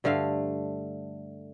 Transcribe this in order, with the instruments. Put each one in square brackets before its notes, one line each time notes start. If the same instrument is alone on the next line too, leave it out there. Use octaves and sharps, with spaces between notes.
[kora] G2 D3 A3 F5